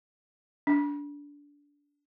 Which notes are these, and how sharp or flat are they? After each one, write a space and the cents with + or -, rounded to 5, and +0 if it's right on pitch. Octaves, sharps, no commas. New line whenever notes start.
D4 -20